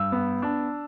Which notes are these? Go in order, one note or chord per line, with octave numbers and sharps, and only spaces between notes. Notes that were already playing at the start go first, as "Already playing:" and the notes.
Already playing: G2 E6
B3
D4